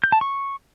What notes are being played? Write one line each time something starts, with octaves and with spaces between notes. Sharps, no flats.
G6
A5
C#6